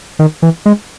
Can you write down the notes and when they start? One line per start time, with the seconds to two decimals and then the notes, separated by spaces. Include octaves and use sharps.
0.19 D#3
0.42 E3
0.66 G#3